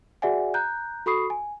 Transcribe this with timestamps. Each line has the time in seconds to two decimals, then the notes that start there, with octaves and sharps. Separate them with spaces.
0.22 F#4 G#4 D5 E5 F#5 G#5
0.54 A#5 F#6 G6
1.06 F#4 A4 B5 C#6 D#6 C7
1.30 G#5